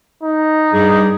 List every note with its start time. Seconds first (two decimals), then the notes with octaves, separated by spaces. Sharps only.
0.23 D#4
0.73 G2 G3 G#4